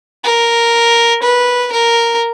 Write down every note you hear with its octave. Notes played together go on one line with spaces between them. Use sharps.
A#4
B4
A#4